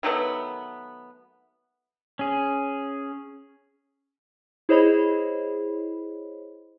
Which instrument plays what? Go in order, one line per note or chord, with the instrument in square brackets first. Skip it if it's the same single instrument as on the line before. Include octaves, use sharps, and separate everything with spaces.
[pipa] D#3 F#3 A3 B3
[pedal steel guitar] C#4 G#4
[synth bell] E4 G#4 C5 C#5 D#5 B5